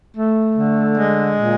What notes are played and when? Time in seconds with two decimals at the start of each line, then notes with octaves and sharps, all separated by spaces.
0.16 A3
0.56 D3
0.97 G#3
1.37 A#2